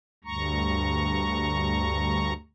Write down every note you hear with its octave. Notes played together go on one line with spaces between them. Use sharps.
D2 G2 A#5 C#6